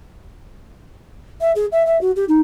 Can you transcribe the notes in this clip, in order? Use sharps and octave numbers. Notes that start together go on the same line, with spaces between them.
E5
G#4
E5
E5
F#4
G4
D#4